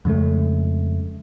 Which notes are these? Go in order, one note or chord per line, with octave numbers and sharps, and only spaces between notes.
F2 C#3 G#3 A3